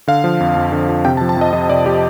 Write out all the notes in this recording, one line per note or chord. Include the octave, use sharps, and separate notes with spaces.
D3 F5
F3
F2
F2
D3
F3
C3 G5
A5
F3
A5
F2 D#5
F2 D#5
C3 D5
F3 G4